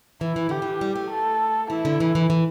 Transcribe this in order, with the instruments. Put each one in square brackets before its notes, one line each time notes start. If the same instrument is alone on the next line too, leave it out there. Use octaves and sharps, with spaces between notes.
[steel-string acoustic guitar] E3 [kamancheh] E4
[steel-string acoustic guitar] E3
[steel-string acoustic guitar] D3 [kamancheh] G4
[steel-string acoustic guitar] E3
G3
A3
[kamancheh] A4
[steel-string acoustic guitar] E3 [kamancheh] E4
[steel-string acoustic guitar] D3
E3
E3
E3